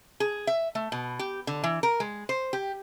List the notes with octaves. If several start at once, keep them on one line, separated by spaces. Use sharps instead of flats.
G#4
E5
A3
B2
G4
D3
E3
A#4
G#3
C5
G4